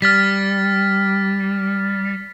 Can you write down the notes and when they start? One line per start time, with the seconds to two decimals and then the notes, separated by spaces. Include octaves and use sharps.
0.02 G3 F6 A6 B6